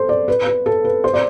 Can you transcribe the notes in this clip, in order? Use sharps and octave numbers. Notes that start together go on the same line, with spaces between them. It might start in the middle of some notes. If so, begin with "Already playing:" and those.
Already playing: A4 C5
D5
B4
B4
A4
B4
C5
D5